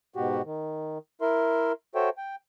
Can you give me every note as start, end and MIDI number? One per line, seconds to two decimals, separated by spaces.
0.16 0.42 44
0.16 0.42 47
0.16 0.42 66
0.16 0.42 67
0.45 0.98 51
1.21 1.72 64
1.21 1.72 70
1.21 1.72 76
1.21 1.72 84
1.95 2.09 66
1.95 2.09 69
1.95 2.09 72
1.95 2.09 73
1.95 2.09 76
1.95 2.09 79
2.18 2.36 79